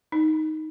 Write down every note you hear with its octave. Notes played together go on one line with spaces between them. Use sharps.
D#4